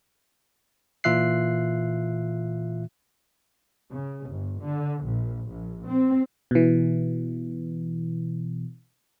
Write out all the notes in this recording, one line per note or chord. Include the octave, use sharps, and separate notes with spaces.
A#2 E3 F4 E5 F#6 C7
C#3
G1
D3
A#1
A#1
C4
B2 E3